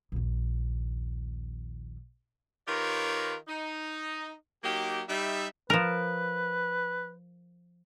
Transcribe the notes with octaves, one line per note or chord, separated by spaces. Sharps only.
A#1 D#2
D#3 F4 G4 A#4 B4 C#5
D#4
F#3 A#3 D#4 G4
G3 D#4 E5
F3 A#4 B4